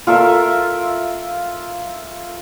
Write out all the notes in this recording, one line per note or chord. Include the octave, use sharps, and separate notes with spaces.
F4 A4 A#4 E5